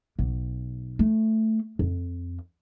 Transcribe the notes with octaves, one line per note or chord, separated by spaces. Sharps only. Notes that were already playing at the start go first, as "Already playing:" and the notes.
B1
A3
F2